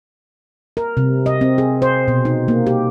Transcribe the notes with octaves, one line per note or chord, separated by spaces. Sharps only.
A#4
C3
D#5
C4
G#4
C5
B2
D#4
A#3
G4